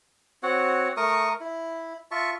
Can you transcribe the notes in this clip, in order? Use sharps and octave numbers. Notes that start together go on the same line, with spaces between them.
C4 F#4 C#5 F#5
A3 A#4 C#6 D#6
E4
F4 E5 A5 C#6